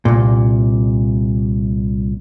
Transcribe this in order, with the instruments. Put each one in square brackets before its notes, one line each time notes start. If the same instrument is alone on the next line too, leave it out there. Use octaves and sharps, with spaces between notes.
[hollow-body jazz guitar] C2 A#2